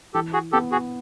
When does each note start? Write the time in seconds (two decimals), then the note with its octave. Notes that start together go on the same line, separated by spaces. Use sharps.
0.14 E3 G4 A4
0.33 F#4 G#4
0.52 B3 G4 A4
0.72 F#4 G#4